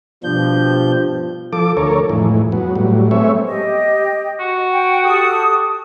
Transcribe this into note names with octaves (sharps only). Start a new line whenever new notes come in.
G2 B2 F3 D4 G6
F3 A4 D6
D2 A4 A#4 C#5
F2 A2 E3 G#3
F#3 B3
A2 F#3 G3
G#3 A3 B3 C4 C#5 E5
G4 D#5
F#4
G5
G4 A4 D#6